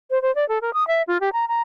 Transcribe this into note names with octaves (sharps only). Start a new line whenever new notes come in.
C5
C5
D5
A4
A#4
D#6
E5
F4
G4
A#5
A#5